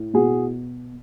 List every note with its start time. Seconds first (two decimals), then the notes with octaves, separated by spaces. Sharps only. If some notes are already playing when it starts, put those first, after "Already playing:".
Already playing: A2
0.13 B2 F#4 G#4